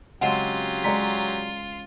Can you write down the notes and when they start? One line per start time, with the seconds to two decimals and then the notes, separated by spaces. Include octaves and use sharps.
0.21 C#3 F#3 G#3 C4 F4 G4 F#5
0.84 G#3 C#5 D5 A#5 B6